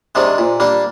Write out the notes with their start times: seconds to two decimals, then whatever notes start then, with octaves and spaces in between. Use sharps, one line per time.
0.15 C3 D#3 G#3 D4
0.38 A#2
0.60 G3 A#3 D4